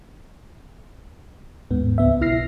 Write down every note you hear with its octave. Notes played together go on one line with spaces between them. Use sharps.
D#2 G#2 B3
C#2 B3 E5
B1 E4 F6 A#6 C7